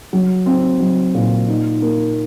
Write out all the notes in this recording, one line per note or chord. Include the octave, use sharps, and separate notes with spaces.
F#3
C4
F#3
A#2
D#4
A#3